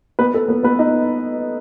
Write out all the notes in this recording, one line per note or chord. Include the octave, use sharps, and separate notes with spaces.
B3 B4
A4
B3 B4
B3 B4
D#4 D#5